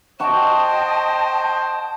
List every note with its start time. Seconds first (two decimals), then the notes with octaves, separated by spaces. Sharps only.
0.20 C5 D#5 F#5 G5 A5 C#6